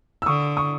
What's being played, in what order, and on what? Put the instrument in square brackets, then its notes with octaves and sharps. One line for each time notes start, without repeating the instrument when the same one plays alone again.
[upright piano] E6
[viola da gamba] D3 [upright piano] C#6 D#6
[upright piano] C#6 D#6